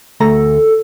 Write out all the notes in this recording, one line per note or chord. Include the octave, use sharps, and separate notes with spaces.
D2 A3 A4 A#5